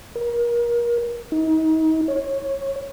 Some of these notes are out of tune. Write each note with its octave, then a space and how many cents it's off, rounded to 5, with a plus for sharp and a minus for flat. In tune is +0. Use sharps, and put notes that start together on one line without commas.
A#4 +30
D#4 +35
C#5 -15